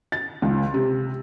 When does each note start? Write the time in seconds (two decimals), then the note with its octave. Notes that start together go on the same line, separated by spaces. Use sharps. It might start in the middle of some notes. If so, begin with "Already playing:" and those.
0.12 A6
0.42 C#2
0.74 C3